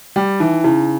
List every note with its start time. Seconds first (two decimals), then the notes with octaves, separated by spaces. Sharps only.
0.16 G3 G5
0.40 E3 D#4
0.64 C#3 E4